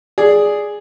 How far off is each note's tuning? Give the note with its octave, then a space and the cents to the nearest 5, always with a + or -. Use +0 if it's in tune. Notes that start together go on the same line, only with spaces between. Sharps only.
G#4 +0 D5 +0